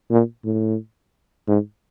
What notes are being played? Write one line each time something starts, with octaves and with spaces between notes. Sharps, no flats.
A#2
A2
G#2